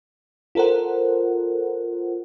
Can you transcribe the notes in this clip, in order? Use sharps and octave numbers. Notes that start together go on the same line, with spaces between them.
F4 A4 A#4 C5 F#5